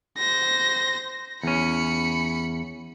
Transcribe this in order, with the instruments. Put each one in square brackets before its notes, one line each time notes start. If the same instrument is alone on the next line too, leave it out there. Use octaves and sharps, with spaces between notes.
[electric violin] C5 A#6
[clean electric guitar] E2 C#4 [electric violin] B5 C#7